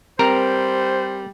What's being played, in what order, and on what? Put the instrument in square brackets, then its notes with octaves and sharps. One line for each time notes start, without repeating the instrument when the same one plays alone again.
[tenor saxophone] G3 [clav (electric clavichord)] C4 A#4 A#5 [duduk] C5